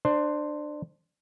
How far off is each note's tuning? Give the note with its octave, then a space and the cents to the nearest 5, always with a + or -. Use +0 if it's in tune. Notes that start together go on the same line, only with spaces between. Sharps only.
D4 +20 C5 +0